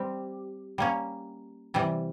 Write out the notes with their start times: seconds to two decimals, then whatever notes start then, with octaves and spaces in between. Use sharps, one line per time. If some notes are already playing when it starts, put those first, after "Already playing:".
Already playing: G3 C4 G4
0.78 G3 A#3 C#4
1.74 C3 E3 G3